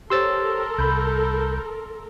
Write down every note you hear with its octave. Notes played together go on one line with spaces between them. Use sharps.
G4 A4 A#4 C5 C#5 C6 E6 A6
C2 B5 G6